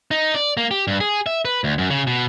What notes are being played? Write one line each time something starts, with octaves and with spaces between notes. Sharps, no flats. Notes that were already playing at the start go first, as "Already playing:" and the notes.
D#4
D5
A#3
G4
G2
G#4
E5
B4
D2
F#2
C#3
B2